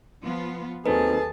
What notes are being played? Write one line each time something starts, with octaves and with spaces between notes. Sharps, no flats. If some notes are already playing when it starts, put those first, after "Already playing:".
F3 B3 F4
D#2 F#3 C4 D#4 G#4 A4 B4 A5